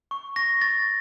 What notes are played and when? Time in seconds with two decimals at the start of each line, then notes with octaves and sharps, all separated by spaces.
0.11 C#6
0.36 C#6 A#6
0.61 C#6 A6